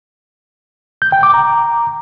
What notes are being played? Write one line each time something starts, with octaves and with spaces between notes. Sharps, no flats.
G6
G5
D6
A#5